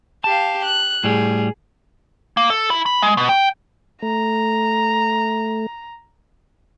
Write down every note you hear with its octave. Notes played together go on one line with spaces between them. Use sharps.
G4 F5 A5
F#6
A2 G3 G#4
A#3
A4
E4
B5
G#3
B2
G5
A3 A#5